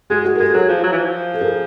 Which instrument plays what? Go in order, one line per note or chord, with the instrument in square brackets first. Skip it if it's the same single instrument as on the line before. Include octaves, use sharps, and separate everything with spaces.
[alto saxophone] G#3 [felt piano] F#4 G#4
[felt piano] F#4 G#4
A#4
[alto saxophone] G#3 [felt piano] G4 A4
[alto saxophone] F#3 [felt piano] G#4 A#4
[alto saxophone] F3
F#3
E3
F3
[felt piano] A4
G#4 A#4